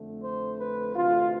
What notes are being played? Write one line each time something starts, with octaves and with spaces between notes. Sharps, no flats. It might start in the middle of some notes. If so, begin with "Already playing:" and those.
Already playing: F2 D3 A3
C5
B4
D2 C3 E3 F4